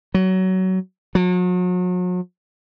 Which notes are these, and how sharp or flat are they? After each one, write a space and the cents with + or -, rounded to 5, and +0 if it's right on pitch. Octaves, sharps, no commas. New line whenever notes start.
F#3 +20
F#3 -40